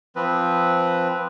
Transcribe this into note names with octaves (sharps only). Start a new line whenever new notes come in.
F3 C4 B4